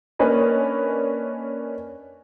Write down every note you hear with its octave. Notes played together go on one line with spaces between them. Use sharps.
A#3 C#4 D4 B4 D#5